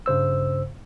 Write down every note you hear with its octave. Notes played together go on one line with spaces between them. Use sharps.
G2 C#3 C5 E6